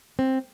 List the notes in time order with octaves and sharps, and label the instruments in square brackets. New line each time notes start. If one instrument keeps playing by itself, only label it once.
[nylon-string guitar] C4